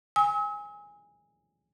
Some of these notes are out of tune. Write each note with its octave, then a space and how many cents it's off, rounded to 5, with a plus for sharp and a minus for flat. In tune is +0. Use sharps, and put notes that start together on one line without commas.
G#5 -15 E6 -45